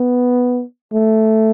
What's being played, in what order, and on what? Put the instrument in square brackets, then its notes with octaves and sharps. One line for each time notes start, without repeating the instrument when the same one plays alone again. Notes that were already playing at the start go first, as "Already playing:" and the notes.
Already playing: [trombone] B3
A3